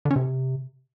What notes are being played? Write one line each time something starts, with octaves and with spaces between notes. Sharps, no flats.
D3
C#4
C3